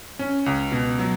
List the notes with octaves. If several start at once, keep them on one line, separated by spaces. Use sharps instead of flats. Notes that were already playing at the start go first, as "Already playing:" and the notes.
C#4
C#2
B2
F#3